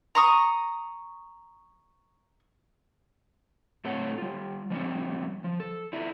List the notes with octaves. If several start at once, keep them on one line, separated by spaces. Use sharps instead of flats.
A#5 C#6 D#6
A2 A3 C4 A4 C#5 F#5
G3 F4
F3 G3 C4 C#4
F3
A4
E4 F4 D5 E5